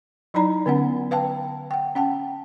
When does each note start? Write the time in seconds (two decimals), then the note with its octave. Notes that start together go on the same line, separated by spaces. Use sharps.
0.34 F#3 D#4 E4 D5 A#5 B5
0.66 D3 B3 C#4 F#5
1.11 B4 F5 G5 A5
1.71 F#5 G5
1.95 C#4 F#5 G5 A5